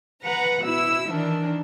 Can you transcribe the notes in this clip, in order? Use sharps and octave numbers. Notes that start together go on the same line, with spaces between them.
B4 F#5 A#5
B2 E4 E6
D#3 E3 D4